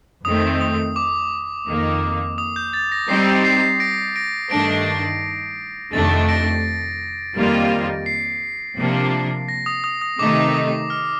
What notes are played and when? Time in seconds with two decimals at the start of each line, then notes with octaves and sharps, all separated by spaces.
0.25 F2 D#3 A3 C4 D#6
0.61 D#6
0.96 D6
1.67 F2 D#3 A#3
2.38 D#6
2.56 G6
2.73 A6
2.92 A#6
3.09 G3 C4 D#4 G4 C7
3.45 C7
3.80 A#6 D7
4.16 A#6 D7
4.51 G2 D#3 A3 D4 A#6 D7
5.93 F2 C3 D#3 A3 D4 A6
6.29 A#6 D7
7.35 F2 D#3 G3 A#3 F4
8.06 C7
8.77 C3 F3 A#3 D4
9.48 A#6
9.66 D#6
9.84 D#6
10.01 D#6
10.19 C3 D#3 A3 D#4 D6
10.54 D#6
10.90 F6